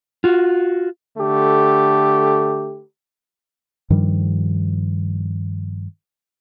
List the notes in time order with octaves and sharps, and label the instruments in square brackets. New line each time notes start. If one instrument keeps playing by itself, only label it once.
[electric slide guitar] F4 F#4
[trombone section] D3 A3 G4
[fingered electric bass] G2 D#3 F3 G3